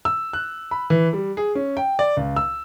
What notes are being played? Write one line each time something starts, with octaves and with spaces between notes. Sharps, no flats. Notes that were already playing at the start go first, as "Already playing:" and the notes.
E6
F#6
B5
E3
G3
G#4
C#4
G5
D5
C#2
E6